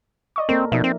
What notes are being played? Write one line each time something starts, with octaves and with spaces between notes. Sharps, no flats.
D5 D#5 C#6
A#3 C4 A4 A#4
B2 F3 D#4 A#4 D5 E5
C4